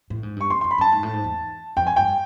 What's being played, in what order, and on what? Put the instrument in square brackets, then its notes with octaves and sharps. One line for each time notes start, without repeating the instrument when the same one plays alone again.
[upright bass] A2
G#2
[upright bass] G2 [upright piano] C#6
[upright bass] F#2 [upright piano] C6
[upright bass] F2 [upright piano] C6
[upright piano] B5
[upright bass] F#2 [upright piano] A5
[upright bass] G#2
A2
G#2
E2
[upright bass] F2 [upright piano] G5
[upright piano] G#5
[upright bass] G2 [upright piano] G5